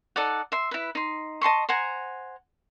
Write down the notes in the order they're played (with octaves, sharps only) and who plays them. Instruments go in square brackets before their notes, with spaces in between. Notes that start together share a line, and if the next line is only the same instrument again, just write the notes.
[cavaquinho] D#4 A4 D5 F#5
E5 C6
E4 B4
D#4 C6
D#5 A5 C6 C#6
C5 F#5 G#5 A#5